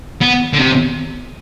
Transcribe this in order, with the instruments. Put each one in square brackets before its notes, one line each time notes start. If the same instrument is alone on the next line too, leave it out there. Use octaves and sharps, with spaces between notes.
[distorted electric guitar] B3
D3
C3